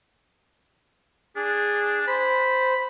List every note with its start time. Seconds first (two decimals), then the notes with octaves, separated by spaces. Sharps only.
1.36 D4 G#4
2.08 C5 B5